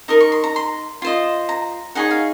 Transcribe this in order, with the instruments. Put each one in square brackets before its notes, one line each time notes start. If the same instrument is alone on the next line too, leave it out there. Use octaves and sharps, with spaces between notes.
[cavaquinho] D#4 A#4 D#6
C#6
C6
A#5
C6
F4 C5 D#5
A#5
D#4 G#4 C#5 F#5
F5